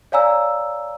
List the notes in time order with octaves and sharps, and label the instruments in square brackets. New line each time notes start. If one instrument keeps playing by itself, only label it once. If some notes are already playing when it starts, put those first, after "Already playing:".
[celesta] C#5 D5 F5 G#5 A#5 E6